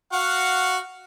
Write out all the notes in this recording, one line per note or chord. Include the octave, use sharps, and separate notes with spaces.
F#4 F5 F#5